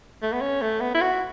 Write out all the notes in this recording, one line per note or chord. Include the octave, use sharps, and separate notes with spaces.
A3
B3
C#4
A3
B3
E4
F#4